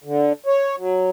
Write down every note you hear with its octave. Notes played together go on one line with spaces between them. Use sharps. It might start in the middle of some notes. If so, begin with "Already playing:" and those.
D3
C#5
F#3